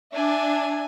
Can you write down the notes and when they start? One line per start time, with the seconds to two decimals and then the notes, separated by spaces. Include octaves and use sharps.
0.13 D4 E5 G#5